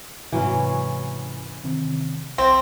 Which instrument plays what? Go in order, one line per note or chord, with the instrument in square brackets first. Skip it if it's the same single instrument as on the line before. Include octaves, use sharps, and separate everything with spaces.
[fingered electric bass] G#2 C3 [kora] E3 F#3 C#4
[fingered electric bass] C3 D#3 C4
[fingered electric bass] B1 [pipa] C4